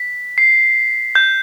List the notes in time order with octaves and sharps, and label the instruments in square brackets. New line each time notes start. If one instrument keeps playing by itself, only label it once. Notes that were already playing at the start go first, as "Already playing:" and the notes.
Already playing: [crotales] B6
C7
G6